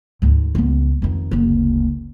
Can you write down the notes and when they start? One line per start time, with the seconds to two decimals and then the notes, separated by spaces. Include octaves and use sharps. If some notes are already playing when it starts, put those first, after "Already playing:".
0.22 D2 G#2
0.55 C#2 B3
1.02 F2 D#3
1.31 F#1 D2